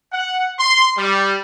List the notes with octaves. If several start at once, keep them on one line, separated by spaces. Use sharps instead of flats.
F#5
C6
G3